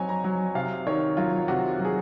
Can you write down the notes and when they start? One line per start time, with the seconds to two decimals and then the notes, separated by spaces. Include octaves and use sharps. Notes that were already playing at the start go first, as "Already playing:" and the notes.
Already playing: F#3 C4 C#5 D#5 G#5
0.09 A#5
0.24 F#3
0.55 C3 F5
0.87 D#3 C#5
1.17 F#3 F4
1.48 C3 F#4
1.79 F#3
1.85 G#4